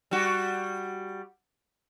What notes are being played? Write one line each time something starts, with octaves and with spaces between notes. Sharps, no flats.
G3 F#4